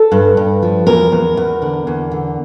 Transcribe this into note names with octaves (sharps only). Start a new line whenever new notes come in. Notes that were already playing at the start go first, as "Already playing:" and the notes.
Already playing: A4
G2
G2
F3
E2 A#4
E2
E2
D3
E2
D3